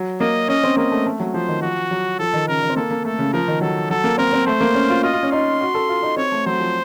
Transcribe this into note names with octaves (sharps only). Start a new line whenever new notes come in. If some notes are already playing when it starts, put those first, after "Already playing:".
Already playing: F#3
A#3 D#5
C#4 D#5
C4
A#3 D#5
A3
A3
F#3
F3 C5
D#3
F3 F#4
F#3
F3 A4
D#3
C#3 A#4
D#3
C4
A#3 A4
A#3
A3 A4
C#3
F3 A#4
D#3
F#3 A4
F#3 A4
A#3
C4 A#4
C4
A3 C5
A#3
C#4
F4
F4 D#5
F4
C#4
D#4 C6
F#4
A4
F4
D#4
C4 C#5
A3
F#3 C5
F3